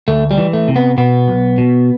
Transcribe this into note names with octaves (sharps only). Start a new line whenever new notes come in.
D2 A3
G3
E3
A3
C3
B3
B2 B3
B1
B2